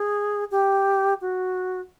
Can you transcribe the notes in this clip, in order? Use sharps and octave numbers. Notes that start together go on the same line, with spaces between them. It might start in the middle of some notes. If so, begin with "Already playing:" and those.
Already playing: G#4
G4
F#4